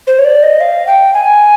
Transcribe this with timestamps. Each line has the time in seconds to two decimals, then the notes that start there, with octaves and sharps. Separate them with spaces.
0.07 C5
0.19 C#5
0.25 D5
0.43 D#5
0.61 F5
0.87 G5
1.14 G#5